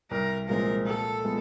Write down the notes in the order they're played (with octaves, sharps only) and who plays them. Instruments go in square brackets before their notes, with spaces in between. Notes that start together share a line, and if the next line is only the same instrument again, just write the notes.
[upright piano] C2 [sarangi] A#4
[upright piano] A#2 F3 G#3 C4 [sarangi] A#4
[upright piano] A#2 [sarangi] A4
[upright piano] F3 G#3 B3